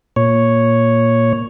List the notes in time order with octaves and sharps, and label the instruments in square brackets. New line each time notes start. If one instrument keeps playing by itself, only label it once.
[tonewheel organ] A#2 C#5